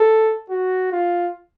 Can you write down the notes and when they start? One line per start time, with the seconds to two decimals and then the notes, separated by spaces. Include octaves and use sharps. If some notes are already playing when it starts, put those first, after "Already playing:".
Already playing: A4
0.50 F#4
0.92 F4